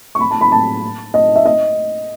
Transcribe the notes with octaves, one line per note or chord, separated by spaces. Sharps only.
C#6
B5
A5
B5
A5
D#5
E5
D#5